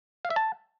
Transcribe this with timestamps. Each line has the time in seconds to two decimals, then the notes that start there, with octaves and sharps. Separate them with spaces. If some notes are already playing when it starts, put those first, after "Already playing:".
0.25 F5
0.30 E5
0.36 A5